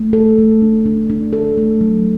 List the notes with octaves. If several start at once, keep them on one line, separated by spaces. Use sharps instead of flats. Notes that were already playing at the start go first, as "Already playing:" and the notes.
Already playing: A3
A4
A3
D4
D4
D4
A4
A3
F#3